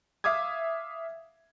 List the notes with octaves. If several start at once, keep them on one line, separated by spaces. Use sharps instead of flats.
E5 F5 D6 D#6 G#6